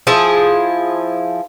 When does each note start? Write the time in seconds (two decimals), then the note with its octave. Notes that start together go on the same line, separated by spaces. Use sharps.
0.07 F3 E4 G#4